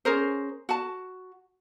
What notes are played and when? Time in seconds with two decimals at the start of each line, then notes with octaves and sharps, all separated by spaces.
0.05 C#4 G#4 A#4 C5
0.69 F#4 A5